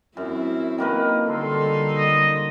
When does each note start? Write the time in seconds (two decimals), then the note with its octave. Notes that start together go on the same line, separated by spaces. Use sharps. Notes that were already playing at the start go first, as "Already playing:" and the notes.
0.17 F#2 C4 E4
0.78 D#3 A#3 B4
1.28 D3 G3 D#4 A4 C6
1.97 D#5